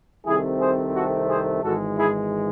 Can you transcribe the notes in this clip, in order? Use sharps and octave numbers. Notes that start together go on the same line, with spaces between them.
C2 C3 D#3 A3 C4 E4 G#4
G#4 C5
F#4 A4
G#4 C5
G#1 G#2 E3 G#3 F#4 A4
E4 G#4